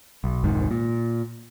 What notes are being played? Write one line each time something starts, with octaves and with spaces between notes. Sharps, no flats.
B1
F1 C2 G#2 D#3
A#2